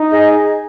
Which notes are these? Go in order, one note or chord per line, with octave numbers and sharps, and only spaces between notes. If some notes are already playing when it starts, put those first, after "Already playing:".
Already playing: D#4
G#4 D#5